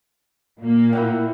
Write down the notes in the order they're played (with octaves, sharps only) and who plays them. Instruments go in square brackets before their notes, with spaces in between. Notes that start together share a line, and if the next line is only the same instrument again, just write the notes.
[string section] A#2 A#3
[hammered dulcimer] E4 F#5 G5